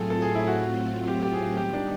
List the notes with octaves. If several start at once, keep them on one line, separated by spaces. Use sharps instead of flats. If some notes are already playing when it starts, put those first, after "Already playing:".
Already playing: A2 F#3 A3 C4 F4 G#4 A4
A4
G#4
E4
F#4
G4
G4
G#4
D#3 G3 B3 D#4 G4
D4